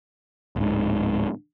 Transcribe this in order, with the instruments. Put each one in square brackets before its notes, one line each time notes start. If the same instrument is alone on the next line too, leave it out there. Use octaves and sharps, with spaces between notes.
[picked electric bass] D1 G#2